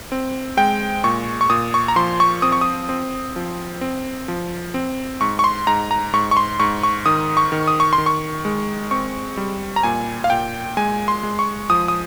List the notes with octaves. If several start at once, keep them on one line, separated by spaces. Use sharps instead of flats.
C4
G#3 G5
A#2 C#6
C#6
A#2 D#6
C#6
A#5
F3 C6
C#6
C4 D#6
C#6
D#6
C4
F3
C4
F3
C4
G#2 C#6
C#6
C6
G#2 A#5
A#5
G#2 C#6
C#6
C6
G#2 C#6
C#6
D#3 D#6
C#6
D#3
D#6
C#6
C6
D#3
C#6
G#3
C4 C#6
G3
A#5
A#2 G#5
F5
A#2 G5
G#3 G#5
C6
G#3
C#6
F3 D#6
D#6